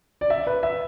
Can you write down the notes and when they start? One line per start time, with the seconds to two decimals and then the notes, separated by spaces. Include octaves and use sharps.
0.21 D5
0.30 E5
0.47 B4
0.63 E5